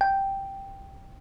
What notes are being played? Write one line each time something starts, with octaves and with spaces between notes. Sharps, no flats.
G5